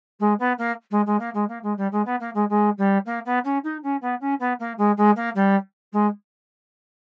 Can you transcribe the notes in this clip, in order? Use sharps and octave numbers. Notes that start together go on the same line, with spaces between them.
G#3
B3
A#3
G#3
G#3
A#3
G#3
A#3
G#3
G3
G#3
B3
A#3
G#3
G#3
G3
A#3
B3
C#4
D#4
C#4
B3
C#4
B3
A#3
G#3
G#3
A#3
G3
G#3